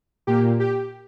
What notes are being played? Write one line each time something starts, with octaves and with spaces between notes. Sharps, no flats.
A#2 A#3 G4
G4